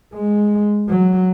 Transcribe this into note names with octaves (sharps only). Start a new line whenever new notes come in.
G#3
F#3